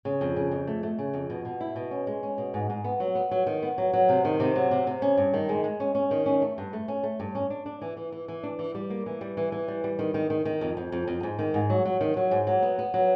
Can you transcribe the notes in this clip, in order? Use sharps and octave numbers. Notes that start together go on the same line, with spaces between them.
C#3
F2
C#3
F2
A3
A3
C#3
F2
B2
B2
E4
B2
C#4
G#3
C#4
B2
G#2
G#2
B3
F#3
B3
F#3
D#3
B3
F#3
F#3
C3
D#3
C3
F#3
C3
C3
C#4
G2
D#3
G#3
G#3
C#4
C#4
D#3
C#4
A3
G2
A3
C#4
A3
G2
C#4
D4
D4
E3
E3
E3
E3
D4
E3
G3
A#3
E3
G3
E3
E3
G3
G3
D#3
D#3
D#3
D#3
F2
F2
F2
F2
G#2
D#3
G#2
F#3
F#3
D#3
F#3
G#2
F#3
B3
B3
F#3